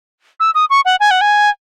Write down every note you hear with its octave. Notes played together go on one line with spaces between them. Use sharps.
E6
D#6
C#6
F#5
G#5
F#5
G#5